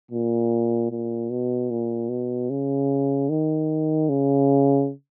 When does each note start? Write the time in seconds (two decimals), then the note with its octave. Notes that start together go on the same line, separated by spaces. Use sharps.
0.11 A#2
0.91 A#2
1.30 B2
1.70 A#2
2.09 B2
2.50 C#3
3.30 D#3
4.09 C#3